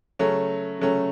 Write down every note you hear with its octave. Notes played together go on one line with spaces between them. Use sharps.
C#3 F#3 A3 C#4
C#3 F#3 A3 C#4